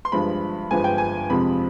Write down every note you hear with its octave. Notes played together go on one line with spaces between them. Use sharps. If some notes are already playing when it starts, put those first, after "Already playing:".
C6
G1 G2 F3 G#3 B5
G1 G2 F3 G#3 G#5
G5
G#5
F2 C3 F3 G#3 B5